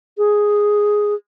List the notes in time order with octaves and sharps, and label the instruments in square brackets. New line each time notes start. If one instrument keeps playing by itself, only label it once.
[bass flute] G#4